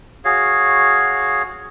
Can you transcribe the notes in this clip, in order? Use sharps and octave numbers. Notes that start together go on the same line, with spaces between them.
F#4 G#4 C#5 F5